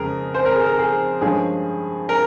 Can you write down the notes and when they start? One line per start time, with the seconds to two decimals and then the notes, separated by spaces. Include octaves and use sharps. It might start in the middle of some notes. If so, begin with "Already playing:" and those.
Already playing: F2 C#3 G#3 G#4 A#4
0.34 C5
0.45 A#4
0.55 G#4
0.66 A#4
0.79 G#4
1.21 G2 F3 G#3 C#4 G#4
2.09 A#4